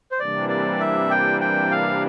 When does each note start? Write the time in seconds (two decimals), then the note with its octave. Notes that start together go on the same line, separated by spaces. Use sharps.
0.11 C5
0.19 C3 E3 G3 A#3 D4 D5
0.49 D5
0.80 E5
1.11 G5
1.41 G5
1.71 F5